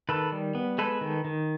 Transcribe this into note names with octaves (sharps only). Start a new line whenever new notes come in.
D#3 A4 B4
G3
B3
G#3 A4 B4
D#3
D#3